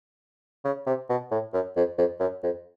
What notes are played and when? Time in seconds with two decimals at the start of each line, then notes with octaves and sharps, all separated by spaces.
0.65 C#3
0.87 C3
1.09 B2
1.31 A2
1.53 F#2
1.76 F2
1.98 F2
2.20 F#2
2.43 F2